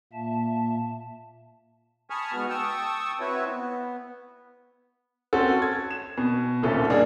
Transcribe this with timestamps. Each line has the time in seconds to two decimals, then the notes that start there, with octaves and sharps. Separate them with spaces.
0.13 A#2 A#3 E5 A5
2.10 G#5 A5 B5 C#6 D#6 F6
2.33 G#2 B3 F#4 F6
2.49 G5 A5 C#6 D#6 E6
3.20 C4 E4 F#4 B4 C#5
3.49 B3
5.33 C4 C#4 F#4 A4
5.62 G#6
5.91 E7
6.18 B2
6.63 D#1 C2 C#4 A4
6.90 G3 A#3 D4 D#4 G#4